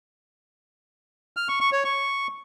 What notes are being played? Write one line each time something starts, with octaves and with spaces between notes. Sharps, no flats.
F6
C#6
C#6
C#5
C#6